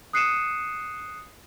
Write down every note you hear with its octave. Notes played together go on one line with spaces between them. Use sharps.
D#6 F#6 C7 C#7 D#7 E7